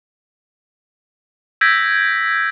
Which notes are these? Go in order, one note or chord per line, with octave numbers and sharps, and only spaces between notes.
E6 G6 G#6 A#6 B6 D7